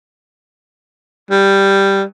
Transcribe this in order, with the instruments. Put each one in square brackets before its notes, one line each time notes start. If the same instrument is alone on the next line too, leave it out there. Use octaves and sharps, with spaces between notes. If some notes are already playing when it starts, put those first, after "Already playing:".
[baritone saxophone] G3